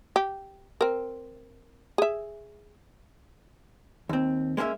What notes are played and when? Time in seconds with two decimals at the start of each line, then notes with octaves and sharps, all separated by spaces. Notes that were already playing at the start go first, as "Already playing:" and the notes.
0.16 G4
0.81 C4 A#4
1.98 G#4 E5
4.09 D#2 C4
4.57 G#3 A#3 C#4 G#4 E5